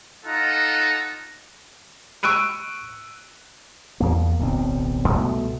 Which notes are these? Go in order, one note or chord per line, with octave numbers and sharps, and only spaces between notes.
D#4 F4 A4 F#5 A#5
C#6 E6 F#6 D7 D#7
E2 A#3
D1 B1 C4
C2 B2 A3